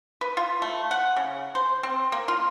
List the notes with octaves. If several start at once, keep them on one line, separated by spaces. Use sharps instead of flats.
B4
F4
A3
F#5
C#3
C5
C4
A#3
F4